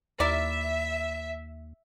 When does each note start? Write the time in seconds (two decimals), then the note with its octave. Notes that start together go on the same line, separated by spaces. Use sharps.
0.20 D#2 E4 A#4 D5 E5